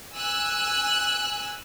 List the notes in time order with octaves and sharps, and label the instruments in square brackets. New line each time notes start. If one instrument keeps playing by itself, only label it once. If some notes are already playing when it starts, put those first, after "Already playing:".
[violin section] G#5 E6 F#6